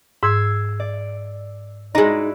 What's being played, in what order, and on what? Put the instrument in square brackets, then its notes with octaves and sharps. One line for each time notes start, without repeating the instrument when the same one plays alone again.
[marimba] G#2 [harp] E6 G#6 C7
[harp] D5
[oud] G#3 D#4 [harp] E4 F#4 D5